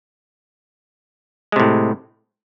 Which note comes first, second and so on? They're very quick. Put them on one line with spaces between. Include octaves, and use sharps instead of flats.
G#3 C3 A2